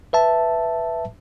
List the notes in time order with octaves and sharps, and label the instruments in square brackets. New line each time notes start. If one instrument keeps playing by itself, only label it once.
[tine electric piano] B4 E5 A5